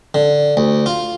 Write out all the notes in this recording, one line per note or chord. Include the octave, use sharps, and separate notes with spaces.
D3
D2
F4